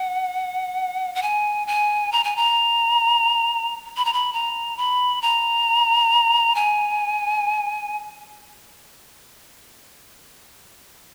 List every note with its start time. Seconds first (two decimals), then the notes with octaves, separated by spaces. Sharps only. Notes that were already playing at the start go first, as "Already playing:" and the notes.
Already playing: F#5
1.15 F#5
1.22 G#5
1.67 G#5
2.12 A#5
2.24 G#5
2.36 A#5
3.97 B5
4.05 A#5
4.13 B5
4.33 A#5
4.77 B5
5.22 A#5
6.55 G#5